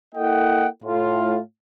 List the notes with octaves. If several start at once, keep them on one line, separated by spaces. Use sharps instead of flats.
A#3 E4 A4 D#5 F#5 G5
A2 F4